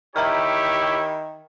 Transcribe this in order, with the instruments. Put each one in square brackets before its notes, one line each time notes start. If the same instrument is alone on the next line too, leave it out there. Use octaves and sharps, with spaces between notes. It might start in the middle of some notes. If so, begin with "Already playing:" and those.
[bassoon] D#3 [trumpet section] E4 G4 C#5 [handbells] E5 A#5 F6